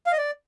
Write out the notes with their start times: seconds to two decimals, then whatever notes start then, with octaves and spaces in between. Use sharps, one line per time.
0.07 F5
0.12 D#5
0.18 D5